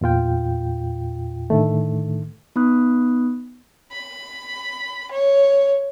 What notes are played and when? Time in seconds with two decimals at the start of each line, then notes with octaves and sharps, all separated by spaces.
0.01 E2 A#2 F4 G5
1.50 A2 D3 D#3 A3
2.56 B3 D#4 B5 D#6 F#6
3.92 B5
5.11 C#5